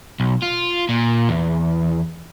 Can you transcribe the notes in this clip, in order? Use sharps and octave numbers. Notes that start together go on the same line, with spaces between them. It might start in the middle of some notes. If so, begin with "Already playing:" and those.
B1
F4
A#2
E2